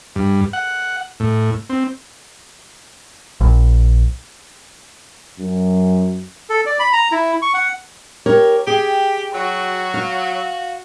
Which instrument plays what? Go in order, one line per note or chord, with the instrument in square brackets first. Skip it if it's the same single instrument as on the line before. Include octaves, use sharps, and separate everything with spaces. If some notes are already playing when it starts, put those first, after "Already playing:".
[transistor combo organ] G2
F#5
A2
C4
[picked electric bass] A#1
[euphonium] F#2
[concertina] A4
D5
B5
A#5
E4
C#6
F#5
[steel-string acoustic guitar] G4 A#4 C#5
[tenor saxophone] G4 [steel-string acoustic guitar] G#4 G5
[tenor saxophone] F#3 [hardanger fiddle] F#4
[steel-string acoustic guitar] F5